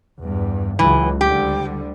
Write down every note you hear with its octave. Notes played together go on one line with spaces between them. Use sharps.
E2 G2
C#2 E3 F#3
D2 D3 G3 G4